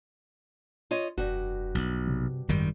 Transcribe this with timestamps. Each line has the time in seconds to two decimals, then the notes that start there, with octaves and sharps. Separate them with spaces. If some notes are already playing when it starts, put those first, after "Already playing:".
0.91 F4 C#5 D#5
1.18 F1 G2 F#4
1.75 B1
2.07 C3
2.49 G#1 F#2 D#3 G3